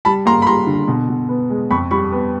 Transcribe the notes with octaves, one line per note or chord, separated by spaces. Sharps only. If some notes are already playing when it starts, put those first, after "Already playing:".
G3 A5 B5
A#3 A#5 C6
B5
G3 A#5 C6
D3
B2
B2
B3
G#3
F2 B5 C#6
G3 B5 C#6
B3